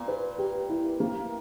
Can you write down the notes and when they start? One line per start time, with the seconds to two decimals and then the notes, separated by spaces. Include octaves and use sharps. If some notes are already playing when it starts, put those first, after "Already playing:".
Already playing: A#2 B3
0.08 B4
0.38 G4
0.69 E4
1.00 A#3